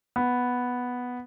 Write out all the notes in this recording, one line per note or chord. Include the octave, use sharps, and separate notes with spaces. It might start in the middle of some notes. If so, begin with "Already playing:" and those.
B3